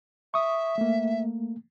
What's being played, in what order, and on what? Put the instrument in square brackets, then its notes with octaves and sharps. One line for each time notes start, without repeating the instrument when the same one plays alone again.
[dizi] E5 [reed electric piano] C#6 D#6
[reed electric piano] A3 A#3